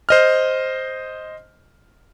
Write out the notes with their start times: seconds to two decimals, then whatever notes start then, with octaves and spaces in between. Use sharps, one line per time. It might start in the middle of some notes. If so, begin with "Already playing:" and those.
0.09 C5 D#5 F6